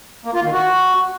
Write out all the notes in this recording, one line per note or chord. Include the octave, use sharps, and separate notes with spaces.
A#3
F4
D#3
F#4